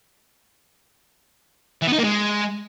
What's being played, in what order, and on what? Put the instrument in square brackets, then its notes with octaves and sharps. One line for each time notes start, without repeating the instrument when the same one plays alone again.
[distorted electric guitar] E3
B3
D#4
A#3
G#3